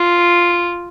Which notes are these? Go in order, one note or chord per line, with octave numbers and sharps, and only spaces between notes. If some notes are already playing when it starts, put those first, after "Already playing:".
Already playing: F4